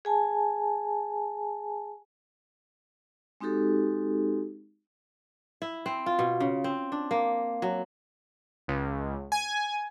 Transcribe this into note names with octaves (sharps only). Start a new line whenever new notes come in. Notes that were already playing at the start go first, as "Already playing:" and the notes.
G#4 G#5 A5
G#3 C4 D#4 F#4 G4 A4
E4
C4
F4
B2
C#3
C4
D4
A#3
F#3
C#2
G#5